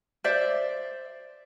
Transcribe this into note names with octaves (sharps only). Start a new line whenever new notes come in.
C5 D5 E5